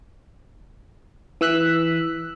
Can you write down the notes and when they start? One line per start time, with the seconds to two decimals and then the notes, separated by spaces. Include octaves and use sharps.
1.41 E3 E6 F#6 B6